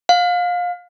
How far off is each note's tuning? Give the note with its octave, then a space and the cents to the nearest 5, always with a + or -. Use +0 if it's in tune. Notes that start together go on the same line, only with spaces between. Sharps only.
F5 +25